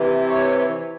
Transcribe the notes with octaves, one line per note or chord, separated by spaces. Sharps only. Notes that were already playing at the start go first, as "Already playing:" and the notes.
Already playing: C3 E3
C#5